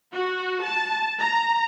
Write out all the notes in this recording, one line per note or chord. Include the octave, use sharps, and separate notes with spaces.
F#4
A5
A#5